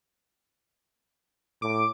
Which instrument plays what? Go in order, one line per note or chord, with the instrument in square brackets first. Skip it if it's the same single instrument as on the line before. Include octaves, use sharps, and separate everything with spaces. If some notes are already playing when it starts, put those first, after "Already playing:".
[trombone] A2 [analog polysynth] D6